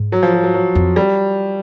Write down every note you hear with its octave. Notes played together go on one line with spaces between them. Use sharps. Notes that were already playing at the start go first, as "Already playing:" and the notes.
Already playing: G#2
F#3
F3
F#3
F#3
F#3
F2
G3